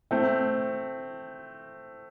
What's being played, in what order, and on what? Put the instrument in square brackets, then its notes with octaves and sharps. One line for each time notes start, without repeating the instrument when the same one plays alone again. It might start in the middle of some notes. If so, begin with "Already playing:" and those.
[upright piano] A3 C4